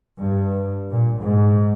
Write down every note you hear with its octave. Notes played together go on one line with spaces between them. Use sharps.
G2
A#2
G#2